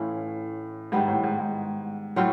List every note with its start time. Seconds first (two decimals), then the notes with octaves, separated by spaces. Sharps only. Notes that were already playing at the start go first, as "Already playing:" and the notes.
Already playing: A2 E3 A3 C#4 F4
0.92 G#2 D#3 G3 B3
1.08 A2
1.24 G#2
1.39 G#2
2.16 A2 F#3 A3 C4 F4